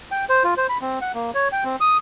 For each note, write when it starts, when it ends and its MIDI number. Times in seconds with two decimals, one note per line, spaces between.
0.11 0.25 79
0.29 0.43 72
0.44 0.54 65
0.57 0.67 72
0.69 0.77 83
0.81 0.99 60
1.01 1.12 78
1.14 1.31 58
1.35 1.48 73
1.52 1.64 79
1.64 1.76 60
1.81 1.97 87